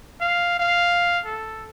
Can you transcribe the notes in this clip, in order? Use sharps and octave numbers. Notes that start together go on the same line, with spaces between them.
F5
F5
A4